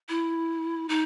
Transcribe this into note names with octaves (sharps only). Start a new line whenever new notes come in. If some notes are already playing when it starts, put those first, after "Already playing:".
E4
D#4